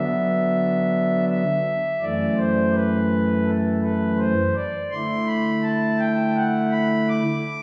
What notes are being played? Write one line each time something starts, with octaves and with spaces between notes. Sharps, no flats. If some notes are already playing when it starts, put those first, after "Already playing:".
Already playing: D3 F#3 B3 D4 E5
E5
F#2 E3 A3 D5
C5
B4
A4
B4
C5
D5
D3 A3 E4 C6
B5
A5
G5
F#5
B5
D6